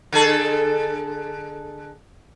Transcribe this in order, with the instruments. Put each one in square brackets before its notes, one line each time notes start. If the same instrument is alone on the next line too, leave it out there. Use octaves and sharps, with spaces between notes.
[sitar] D3 G#4 A4